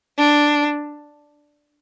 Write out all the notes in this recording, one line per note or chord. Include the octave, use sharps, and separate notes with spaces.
D4